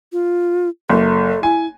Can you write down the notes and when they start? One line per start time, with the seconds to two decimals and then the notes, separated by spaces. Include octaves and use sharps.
0.13 F4
0.90 F#1 A4
1.43 E4 G#5